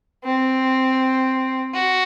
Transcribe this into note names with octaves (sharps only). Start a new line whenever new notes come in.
C4
F#4